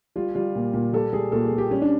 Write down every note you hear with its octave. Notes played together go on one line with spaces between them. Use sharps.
G3 F4
G3 F4
A#2
A#2
G3 A4
G3 G#4
A#2 A4
G#4
A#2
G4
G3 C#4
D4